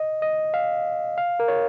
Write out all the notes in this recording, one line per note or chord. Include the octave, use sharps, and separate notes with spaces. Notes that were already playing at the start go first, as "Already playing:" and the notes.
Already playing: D#5
D#5
F5
F5
A#4
C#5